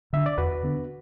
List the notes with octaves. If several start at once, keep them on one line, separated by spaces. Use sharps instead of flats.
D3 B3 D4 E5
D5
E2 F#4 B4
D3 B3 D4